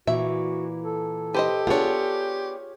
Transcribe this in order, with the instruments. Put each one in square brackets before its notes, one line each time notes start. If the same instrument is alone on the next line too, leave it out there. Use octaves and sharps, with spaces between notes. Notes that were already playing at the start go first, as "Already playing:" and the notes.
[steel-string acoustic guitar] A#2 E3 [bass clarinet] F#4 [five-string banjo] E5
[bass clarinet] A4
[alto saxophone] G4 [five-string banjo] B4 C5 D#5
[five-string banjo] B3 D4 [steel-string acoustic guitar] F4 G#4 C#5